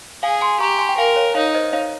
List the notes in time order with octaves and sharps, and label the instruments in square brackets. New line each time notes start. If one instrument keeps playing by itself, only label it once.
[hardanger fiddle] G#4 [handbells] F5 G#5
[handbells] G#5 C6
[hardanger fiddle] G4 [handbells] A#5 C#6
[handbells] G#5 C6
G5
[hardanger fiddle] A#4 [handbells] F5 G#5
[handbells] C#5 F5
[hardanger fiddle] D#4 [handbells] C#5 F5
[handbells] C5 D#5
C#5 F5